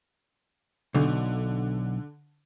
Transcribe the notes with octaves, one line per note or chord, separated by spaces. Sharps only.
B1 D3